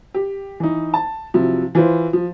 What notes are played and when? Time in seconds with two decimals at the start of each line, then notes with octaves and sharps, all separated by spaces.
0.14 G4
0.60 E3 D#4
0.94 A5
1.34 C3 F3 F#3 E4
1.75 E3 F4 B4 C5
2.13 F3